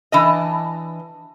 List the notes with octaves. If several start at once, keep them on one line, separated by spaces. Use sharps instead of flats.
E3 D4 D#5